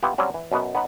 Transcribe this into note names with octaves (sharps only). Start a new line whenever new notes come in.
B3 E4 F4 G4
F#3 G3 C4 C#4 F#4
E3
F#2 B2 B3
B3 C#4 D#4 F#5